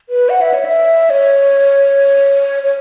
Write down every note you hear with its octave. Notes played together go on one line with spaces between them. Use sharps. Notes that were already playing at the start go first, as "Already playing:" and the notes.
B4
F#5
E5
C#5
E5
C#5
C#5